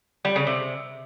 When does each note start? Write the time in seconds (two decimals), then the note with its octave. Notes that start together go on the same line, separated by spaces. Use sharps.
0.25 G3
0.36 C#3
0.47 C3